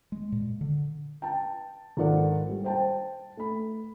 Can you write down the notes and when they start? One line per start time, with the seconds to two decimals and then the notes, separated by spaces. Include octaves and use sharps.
0.12 G#3
0.32 A#2
0.61 D3
1.22 G5 A5
1.97 G#1 F4 A4 A#4 D5 F#5
2.49 G3
2.64 C5 G5 A5
3.37 A3 B5